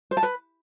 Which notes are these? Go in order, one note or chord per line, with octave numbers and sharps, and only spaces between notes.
C5
A5
B4